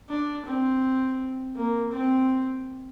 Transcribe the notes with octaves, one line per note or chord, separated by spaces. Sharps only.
D4
C4
A#3
C4